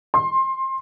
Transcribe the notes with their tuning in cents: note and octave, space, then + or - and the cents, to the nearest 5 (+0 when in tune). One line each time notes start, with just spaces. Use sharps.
C6 +20